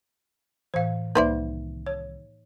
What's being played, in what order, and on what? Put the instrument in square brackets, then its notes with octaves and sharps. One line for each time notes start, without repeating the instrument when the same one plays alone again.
[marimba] A2 E3 [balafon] C5 F5
[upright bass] C2 D#3 [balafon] A#3 D#4 E5 [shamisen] B4 C5 D5
[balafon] C#5